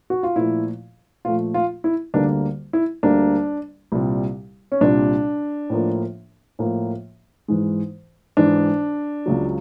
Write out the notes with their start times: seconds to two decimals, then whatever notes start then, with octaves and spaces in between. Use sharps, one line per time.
0.10 F#4
0.23 F4
0.36 A#2 F3 A3 E4
1.25 A#2 F3 A3 F4
1.54 F4
1.84 E4
2.14 D2 D3 G3 A#3 D4
2.73 E4
3.03 D2 D3 G3 A#3 D4
3.92 C2 A#2 G3
4.72 C#4
4.81 C2 A#2 G3 D4
5.70 A2 F3 A#3
6.59 A2 F3 A#3
7.48 G#2 E3 G#3
8.37 G#2 E3 G#3 D4
9.26 C#2 C#3 F#3